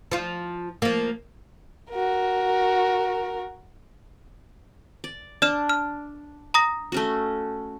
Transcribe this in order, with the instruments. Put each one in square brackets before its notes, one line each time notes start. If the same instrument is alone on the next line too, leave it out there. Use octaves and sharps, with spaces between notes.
[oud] F3 F4
F3 A#3
[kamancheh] F#4 A#4
[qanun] D5
[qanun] D4 [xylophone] D5 F6 E7
[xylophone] F6
A#5 D#6 A#6
[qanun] A3 C#4 F#4